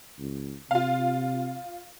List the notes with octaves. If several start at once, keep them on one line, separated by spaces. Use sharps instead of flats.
C#2
C3 F4 F5